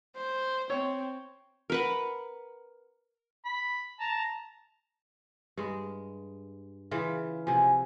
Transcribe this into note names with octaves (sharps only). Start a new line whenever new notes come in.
C5
C4 C#5
A#4 B4 F#5
B5
A5 A#5
G2 G#3
C#3 E3 F4
C3 F3 G#5